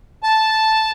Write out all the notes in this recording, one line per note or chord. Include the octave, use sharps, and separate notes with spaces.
A5